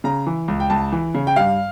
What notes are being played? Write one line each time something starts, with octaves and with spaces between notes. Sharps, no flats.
C#3 A#5
E3
C#2
G5
C#2 A5
E3
C#3
G5
G2 F5